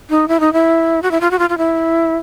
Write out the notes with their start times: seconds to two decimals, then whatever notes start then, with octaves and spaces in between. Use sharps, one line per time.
0.10 D#4
0.28 E4
0.40 D#4
0.53 E4
1.02 F#4
1.11 E4
1.21 F4
1.31 F#4
1.39 F4
1.49 F4
1.58 E4